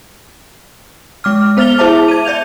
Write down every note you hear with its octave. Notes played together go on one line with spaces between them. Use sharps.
G#3 D6 F6
B3 C5 F6 A6 F7 G7
E4 G#4 C5 E5 A5 D6
G#6 D#7
D5 E5 G6 F7